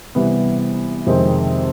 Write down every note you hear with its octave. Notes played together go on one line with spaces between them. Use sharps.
C3 E3 G3 B3
F2 C3 D#3 G#3 C4